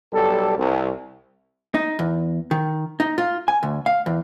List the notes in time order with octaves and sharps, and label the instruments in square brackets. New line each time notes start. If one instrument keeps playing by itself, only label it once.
[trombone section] B1 G3 A4
C2
[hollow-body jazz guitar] D#4
E2
D#3
D#4
F4
G#5
D2
F5
E2